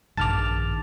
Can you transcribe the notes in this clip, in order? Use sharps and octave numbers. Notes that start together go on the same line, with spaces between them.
A#1 G2 D#3 A5 D6 F6 A6 F7